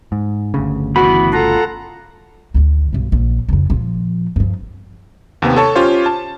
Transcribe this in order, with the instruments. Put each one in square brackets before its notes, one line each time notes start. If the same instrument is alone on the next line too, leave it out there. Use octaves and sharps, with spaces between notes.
[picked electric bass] G#2
G1 D2 C#3
[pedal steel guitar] E3 B3 B5 [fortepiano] F#4
[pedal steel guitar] F4 [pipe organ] A4 F#5 A#5
[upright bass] D2 D#3
B1 G2
A#1
F2 C#3
A#2 F3
G2 F3
[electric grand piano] D#2 C3 B3
A4 C#5 A5 C#6
C#4 F4 G4 C5 C#5 F5
A5